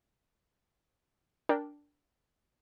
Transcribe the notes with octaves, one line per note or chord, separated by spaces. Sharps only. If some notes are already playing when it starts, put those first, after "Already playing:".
D4 A#4 G5